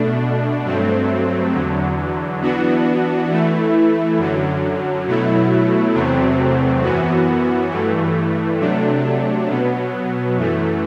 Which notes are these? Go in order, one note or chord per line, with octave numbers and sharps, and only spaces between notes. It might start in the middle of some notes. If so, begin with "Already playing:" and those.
Already playing: B2 A3 D4
G2 F#3 A3 C4
E2 D3 F#3
E3 B3 D4 F#4
E3 A3 E4
F#2 D3 F#3
B2 F#3 A3 E4
E2 C3 F#3 A3 C4
F#2 E3 B3 F#4
G2 E3 A3
C3 F#3 A3 D4
B2 F#3 B3
F#2 E3 A3